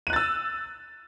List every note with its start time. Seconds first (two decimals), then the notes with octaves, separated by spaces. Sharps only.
0.07 D#7
0.10 F#6
0.13 A6
0.16 E6